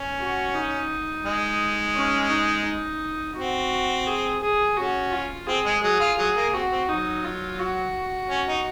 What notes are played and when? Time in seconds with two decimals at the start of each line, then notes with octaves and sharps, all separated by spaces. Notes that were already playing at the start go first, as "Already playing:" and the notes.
Already playing: C#4
0.19 F#4
0.55 D#4
1.25 G#3
1.95 C#4
2.30 D#4
2.65 D#4
3.36 C4 F#4
4.07 G#4
4.42 G#4
4.77 C#4 F#4
5.12 F4
5.47 C4 G#4
5.65 G#3
5.83 F#3 G#4
6.00 F4
6.18 F#3 G#4
6.35 A#3
6.53 C4 F#4
6.71 C4
6.88 F#3 D#4
7.24 F4
7.59 F#4
8.30 C#4
8.47 D#4